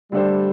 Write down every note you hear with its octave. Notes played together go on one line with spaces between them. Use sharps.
D3 G3 A3 D4 A4 C5